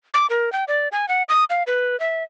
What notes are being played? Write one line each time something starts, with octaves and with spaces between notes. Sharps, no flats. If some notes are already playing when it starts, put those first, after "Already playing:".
D6
A#4
G5
D5
G#5
F#5
D#6
F5
B4
E5